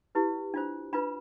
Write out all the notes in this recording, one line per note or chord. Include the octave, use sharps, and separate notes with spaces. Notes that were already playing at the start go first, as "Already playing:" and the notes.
E4 G4 B4
D4 F4 C5
D4 F4 B4 B5